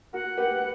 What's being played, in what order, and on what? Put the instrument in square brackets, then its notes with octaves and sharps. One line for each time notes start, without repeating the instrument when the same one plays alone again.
[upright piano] F#4 A#4 [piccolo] F#5
[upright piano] G4 B4